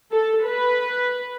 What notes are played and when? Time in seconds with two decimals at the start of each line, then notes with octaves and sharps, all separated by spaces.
0.12 A4
0.45 B4